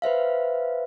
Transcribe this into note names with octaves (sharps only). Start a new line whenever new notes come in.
B4 C5 E5 F5